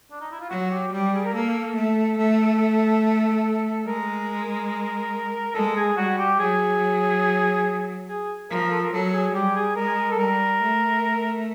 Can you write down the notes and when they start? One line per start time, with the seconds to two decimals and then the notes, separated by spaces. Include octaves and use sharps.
0.11 D4
0.21 D#4
0.31 E4
0.40 F4
0.50 F#3 F#4
0.71 G4
0.92 G3 G4
1.13 G#4
1.24 A#4
1.34 A#3 A4
1.76 A3
2.18 A3
3.87 G#3 A#4
5.55 G#3 A4
5.77 G#4
5.97 G3 F#4
6.18 G4
6.39 F#3 G#4
8.09 G#4
8.50 F3 A#4
8.71 A4
8.82 A#4
8.93 F#3 A4
9.13 G#4
9.34 G3 G4
9.55 G#4
9.76 G#3 A#4
10.11 A4
10.18 G3 A#4
10.61 A3